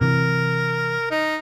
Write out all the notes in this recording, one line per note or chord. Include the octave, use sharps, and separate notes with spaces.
C3 E3 A#4
D#4